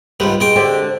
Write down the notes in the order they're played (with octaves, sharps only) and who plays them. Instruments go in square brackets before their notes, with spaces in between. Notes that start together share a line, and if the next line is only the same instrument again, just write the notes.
[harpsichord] C#2 G#2 G3 [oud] B4
[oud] B2 [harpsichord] G#3 G5
[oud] D3 C4 G4